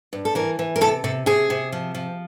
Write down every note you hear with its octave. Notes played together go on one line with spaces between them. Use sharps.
G2
A4
E3 A#4
E3
A#4
C3 A4
C3 A4
C3 G#4
C3
F3
F3